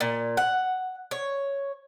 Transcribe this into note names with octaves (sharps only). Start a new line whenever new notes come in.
A#2
F#5
C#5